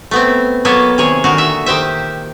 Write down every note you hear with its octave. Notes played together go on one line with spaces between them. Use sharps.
A3 B3 C4
F#3 A#3 B3 A4 C#5
C3 D#3 G#4 C#5
A#2 D3 D#3 F#4 F5
E5
D#3 G4 C5 E5